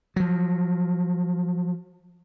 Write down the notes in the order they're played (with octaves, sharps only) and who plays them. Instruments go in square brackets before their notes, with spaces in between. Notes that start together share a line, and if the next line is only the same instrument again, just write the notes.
[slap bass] F3 F#3